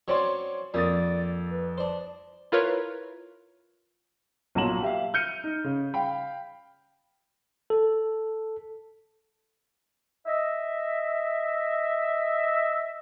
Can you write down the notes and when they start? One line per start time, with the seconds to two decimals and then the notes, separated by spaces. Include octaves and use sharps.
0.08 F#3 C4 C#4 C#5 D5 C6
0.74 F2 A#3 D5 D#6 A6
1.52 B4
1.78 D4 C5 D5
2.52 E4 F4 A#4 B4 C#5
4.55 B1 A#2 F#3 A#5 E7 F#7
4.82 G4 E5 F5
5.14 F6 G6 C#7 D#7
5.44 D#4
5.64 C#3
5.94 F5 G5 B5
7.70 A4
10.26 D#5 E5